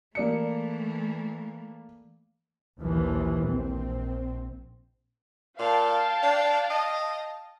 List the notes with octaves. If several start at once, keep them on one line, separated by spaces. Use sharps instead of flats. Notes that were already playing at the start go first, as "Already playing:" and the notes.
E3 A3 A#3 D5 C#7
A#1 D#2 A#2 E3 F3
A#1 C4
A#2 F5 G5 A5
D4
D#5